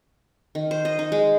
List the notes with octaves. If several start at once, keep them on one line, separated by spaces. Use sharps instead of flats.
D#3
C5
D#5
D#4
G#3